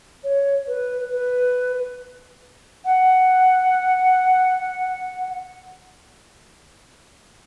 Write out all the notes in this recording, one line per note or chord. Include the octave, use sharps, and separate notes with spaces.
C#5
B4
B4
F#5